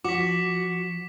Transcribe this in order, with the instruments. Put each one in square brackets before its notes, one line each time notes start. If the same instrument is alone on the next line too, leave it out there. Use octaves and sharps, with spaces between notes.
[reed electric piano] F3 [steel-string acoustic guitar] F#4 [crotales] D6 B6